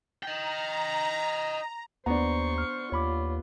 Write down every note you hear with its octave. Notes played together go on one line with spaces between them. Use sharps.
D#5 G5 A#5
D#2 B3 D4 C5 A#5 C#6
F6
D#2 F4 C#5 B5 D6